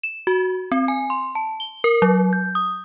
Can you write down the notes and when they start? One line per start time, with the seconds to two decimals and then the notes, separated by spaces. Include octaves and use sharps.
0.03 E7
0.27 F#4
0.72 C4
0.88 G#5
1.10 C6
1.35 A5
1.60 G7
1.84 A#4
2.02 F#3
2.33 G6
2.55 D#6